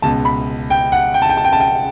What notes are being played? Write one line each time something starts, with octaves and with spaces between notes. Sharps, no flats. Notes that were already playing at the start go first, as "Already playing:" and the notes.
C#2 B2 A5
B5
G5
F#5
G5
A5
G5
A5
G5
A5
G5